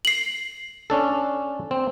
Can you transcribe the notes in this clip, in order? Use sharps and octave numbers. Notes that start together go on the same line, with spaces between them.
C7 F#7
C#4 D4 A4
C4